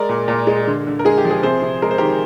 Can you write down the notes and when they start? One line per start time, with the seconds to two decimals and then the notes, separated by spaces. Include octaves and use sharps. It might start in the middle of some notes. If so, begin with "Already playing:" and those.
Already playing: G#3 A#4 D5
0.09 A#2
0.28 A#2
0.47 G#3
0.67 D3
0.87 D3
0.99 A#4
1.05 G#3 G#4
1.18 G4
1.25 F3
1.31 G#4
1.43 C3 G#4 C5
1.62 C3
1.82 G#3 A#4
1.91 C5
1.98 D#3 G4 A#4